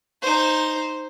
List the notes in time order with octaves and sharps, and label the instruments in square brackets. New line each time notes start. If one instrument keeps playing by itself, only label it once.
[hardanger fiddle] D#4 C5